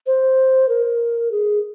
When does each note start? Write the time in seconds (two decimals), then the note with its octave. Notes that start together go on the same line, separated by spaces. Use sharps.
0.07 C5
0.69 A#4
1.31 G#4